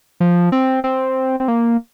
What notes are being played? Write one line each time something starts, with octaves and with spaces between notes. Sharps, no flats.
F3
C4
C4
C4
A#3